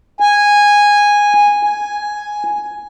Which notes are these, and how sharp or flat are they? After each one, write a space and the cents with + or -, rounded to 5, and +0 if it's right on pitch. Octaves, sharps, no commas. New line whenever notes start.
G#5 -10
G#5 +5